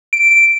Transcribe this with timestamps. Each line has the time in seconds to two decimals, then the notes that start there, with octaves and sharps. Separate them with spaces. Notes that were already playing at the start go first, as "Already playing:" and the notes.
0.13 D7